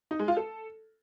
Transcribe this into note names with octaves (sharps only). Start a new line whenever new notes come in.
D#4
G#3
F4
A4